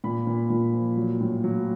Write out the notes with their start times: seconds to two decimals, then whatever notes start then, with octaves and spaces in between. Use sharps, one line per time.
0.04 A#2 B5
0.27 A#2
0.50 A#2
0.74 F3
0.97 F#3
1.21 A2
1.44 F#3